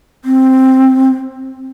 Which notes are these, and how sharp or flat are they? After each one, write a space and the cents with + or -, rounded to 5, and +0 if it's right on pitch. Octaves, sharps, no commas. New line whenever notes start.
C4 +5